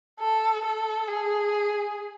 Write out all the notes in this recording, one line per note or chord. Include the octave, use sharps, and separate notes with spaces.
A4
A4
G#4